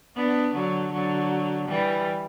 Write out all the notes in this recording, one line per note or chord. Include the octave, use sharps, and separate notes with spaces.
B3 D4
D3 F#3
D3 F#3
E3 G3